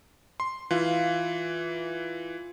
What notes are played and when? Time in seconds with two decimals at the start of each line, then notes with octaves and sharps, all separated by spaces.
0.40 C6
0.71 E3 F4